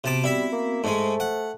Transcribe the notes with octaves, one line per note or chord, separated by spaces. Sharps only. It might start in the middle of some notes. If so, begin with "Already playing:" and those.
C3 B3 C4 F#4 A5 D6
G3 E4 E5
A#3
G#2 G#3 A3 C5
F#5